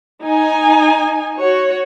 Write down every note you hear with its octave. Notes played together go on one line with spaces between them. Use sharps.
D#4 G#5
F#4 C#5